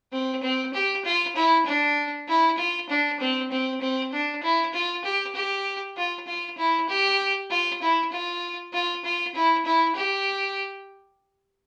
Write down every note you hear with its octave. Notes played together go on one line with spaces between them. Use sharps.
C4
C4
G4
F4
E4
D4
E4
F4
D4
C4
C4
C4
D4
E4
F4
G4
G4
F4
F4
E4
G4
F4
E4
F4
F4
F4
E4
E4
G4